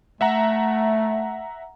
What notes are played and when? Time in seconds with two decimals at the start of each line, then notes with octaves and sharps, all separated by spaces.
0.21 A3 E5 F#5 A#5